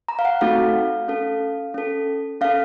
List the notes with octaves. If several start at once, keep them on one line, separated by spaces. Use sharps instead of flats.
A#5
F5
F#5
A3 C4 D#4 F#4 A4 F5
C#4 A4
C#4 A4
C#4 A4 F5